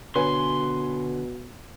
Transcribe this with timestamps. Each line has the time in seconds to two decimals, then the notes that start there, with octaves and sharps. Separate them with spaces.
0.16 B2 D3 B4 C#5 G#5 C6